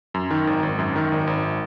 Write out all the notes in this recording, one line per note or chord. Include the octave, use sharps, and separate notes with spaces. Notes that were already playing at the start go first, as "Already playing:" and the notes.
F#2
D#3
G#1
G#1
F#2
D#3
G#1
G#1